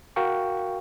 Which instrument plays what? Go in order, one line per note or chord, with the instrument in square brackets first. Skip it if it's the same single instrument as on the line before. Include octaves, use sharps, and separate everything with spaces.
[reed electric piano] F#4 A#4 F5 G5 C#6